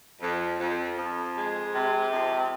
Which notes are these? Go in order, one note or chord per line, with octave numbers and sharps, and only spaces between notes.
F2
F2
F2
G#3
C3
F2